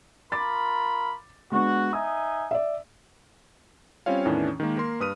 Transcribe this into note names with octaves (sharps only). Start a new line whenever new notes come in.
F4 A#4 B5 D6 A6
G#3 B3 D4 F#4
D#4 E5 G#5 D#6
D5 E5
G3 C4 C#4 F4 C#5 F5
E2 A2 D#3 E3 C#4 D4
D#3 G#3 A#3
A#3 A#4 C6
G2 B4 D#6 F6 D#7